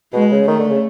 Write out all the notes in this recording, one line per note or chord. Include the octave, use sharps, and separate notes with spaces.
B2 G#3
C#3
D#3 A3
D3
C#3